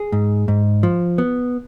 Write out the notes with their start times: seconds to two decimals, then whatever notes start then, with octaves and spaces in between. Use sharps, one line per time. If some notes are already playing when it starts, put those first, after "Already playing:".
Already playing: G#4
0.12 G#2
0.48 G#2
0.83 F3
1.18 B3